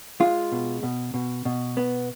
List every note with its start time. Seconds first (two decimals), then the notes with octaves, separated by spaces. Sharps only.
0.20 G#3 F4
0.52 B2
0.83 B2
1.14 B2
1.45 B2
1.77 B3